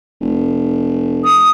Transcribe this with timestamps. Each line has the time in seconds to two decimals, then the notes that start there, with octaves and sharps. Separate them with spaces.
0.21 F1
1.24 D#6